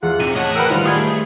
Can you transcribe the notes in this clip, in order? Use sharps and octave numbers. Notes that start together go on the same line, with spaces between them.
E2 F4 G#4 F#5 F#6
C3 D#4 G#4 D#7
A2 C#5 F#5 A5 D#6
A#4 B4 F#5 G5 E6
D#3 G3 F4 C5 F6
A3 G#4 D#6 G#6